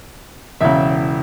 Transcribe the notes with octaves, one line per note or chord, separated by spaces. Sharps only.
E1 E2 C#3 E5